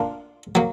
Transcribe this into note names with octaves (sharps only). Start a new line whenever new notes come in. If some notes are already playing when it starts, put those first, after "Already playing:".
Already playing: A#3 D4 F4
F#3 A#3